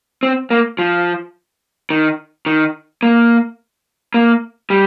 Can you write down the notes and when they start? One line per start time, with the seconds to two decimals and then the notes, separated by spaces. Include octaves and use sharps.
0.23 C4
0.50 A#3
0.79 F3
1.90 D#3
2.46 D#3
3.03 A#3
4.14 A#3
4.70 G3